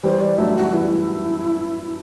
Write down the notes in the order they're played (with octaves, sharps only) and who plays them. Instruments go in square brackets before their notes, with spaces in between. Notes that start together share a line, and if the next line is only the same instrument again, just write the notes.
[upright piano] E3 G3 [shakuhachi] C5
[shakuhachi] D5
[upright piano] F#3 A3 [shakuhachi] E5
[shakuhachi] F#4
[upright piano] E3 G3 [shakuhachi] E4